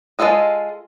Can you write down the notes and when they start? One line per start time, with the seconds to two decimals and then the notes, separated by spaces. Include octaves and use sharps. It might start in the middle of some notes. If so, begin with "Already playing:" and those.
0.19 G#3 D#4 F4 A4 D#5